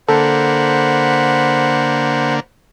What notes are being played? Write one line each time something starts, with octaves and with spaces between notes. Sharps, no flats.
D3 A#3 A4 C5 F#5 B5